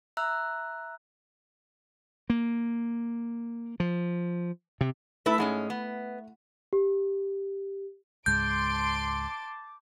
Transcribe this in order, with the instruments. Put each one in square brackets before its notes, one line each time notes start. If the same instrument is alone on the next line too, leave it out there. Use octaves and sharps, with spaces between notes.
[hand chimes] E5 A#5 E6 F#6
[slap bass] A#3
F3
C3
[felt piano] A3 [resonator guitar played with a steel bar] E4 A4 B4
[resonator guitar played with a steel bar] G#2 G#3 C#4
B3
[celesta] G4
[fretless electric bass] C#2 G#2 G#3 [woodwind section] A5 D6 [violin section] C6 D7 [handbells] G6